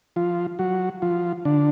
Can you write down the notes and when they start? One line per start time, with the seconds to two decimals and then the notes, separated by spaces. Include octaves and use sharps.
0.16 F3 F4
0.59 F#3 F#4
1.02 F3 F4
1.45 D3 D4